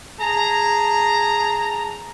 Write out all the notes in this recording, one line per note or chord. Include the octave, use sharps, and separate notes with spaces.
G#4 A5 A#5